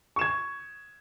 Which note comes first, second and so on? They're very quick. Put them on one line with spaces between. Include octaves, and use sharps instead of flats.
C#6 E7 G#6